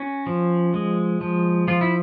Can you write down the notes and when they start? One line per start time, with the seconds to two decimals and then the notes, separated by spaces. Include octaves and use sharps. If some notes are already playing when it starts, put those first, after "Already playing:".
Already playing: C#4 F#4
0.27 F3
0.74 G#3
1.21 F3
1.68 F3 F4
1.81 E4